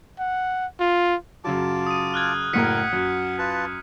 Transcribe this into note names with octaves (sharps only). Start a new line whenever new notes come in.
F#5
F4
F#2 C#3 F#3 F4 A5 D6
D#6 D#7
F6 F#6 G#6
F#1 A2 A#4 F#5 B6 C#7 D#7
F#2
F4 B4 A5